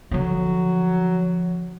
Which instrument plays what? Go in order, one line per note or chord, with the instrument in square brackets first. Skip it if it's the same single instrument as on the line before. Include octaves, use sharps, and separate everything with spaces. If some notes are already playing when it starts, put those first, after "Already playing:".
[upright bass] D3 F3 [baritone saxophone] F#3